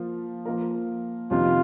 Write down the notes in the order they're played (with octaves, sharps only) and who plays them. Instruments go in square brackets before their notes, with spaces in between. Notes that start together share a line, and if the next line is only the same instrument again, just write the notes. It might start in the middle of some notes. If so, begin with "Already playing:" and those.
Already playing: [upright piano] F3 A#3 F4
F3 A#3 F4 A#4
[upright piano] F2 C3 D#3 [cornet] F4